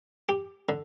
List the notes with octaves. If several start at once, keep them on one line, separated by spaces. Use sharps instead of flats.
G4
D3